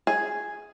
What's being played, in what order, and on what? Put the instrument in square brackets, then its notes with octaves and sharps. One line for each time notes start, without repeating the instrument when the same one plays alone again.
[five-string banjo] G#4